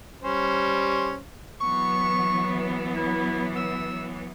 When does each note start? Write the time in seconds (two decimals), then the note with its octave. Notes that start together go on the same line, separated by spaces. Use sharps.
0.22 G3 C#4 C5
1.61 E3 F#3 B3 C#6
2.96 E4
3.56 E6